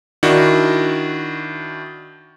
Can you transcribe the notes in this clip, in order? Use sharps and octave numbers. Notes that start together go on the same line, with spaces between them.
D#3 D4 E4 F#4